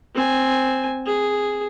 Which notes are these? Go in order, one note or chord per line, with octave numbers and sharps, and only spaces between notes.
C4 G#5
G#4